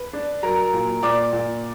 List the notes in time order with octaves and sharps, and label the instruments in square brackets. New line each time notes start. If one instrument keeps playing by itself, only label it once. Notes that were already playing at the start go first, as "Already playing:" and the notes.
Already playing: [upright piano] B4
D4
F#3 A#4 A#5
A#2
A#2 D5 D6
A#2